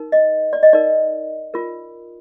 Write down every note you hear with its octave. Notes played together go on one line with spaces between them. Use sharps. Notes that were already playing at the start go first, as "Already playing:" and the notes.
Already playing: D#4 A#4
D#5
D5
D#5
D#4 A#4 D5
F4 A#4